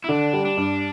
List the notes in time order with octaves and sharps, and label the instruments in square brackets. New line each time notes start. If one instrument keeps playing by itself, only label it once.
[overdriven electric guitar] E4
[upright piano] D3 [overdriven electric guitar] D4
[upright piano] G3
[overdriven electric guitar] D4
[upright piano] G2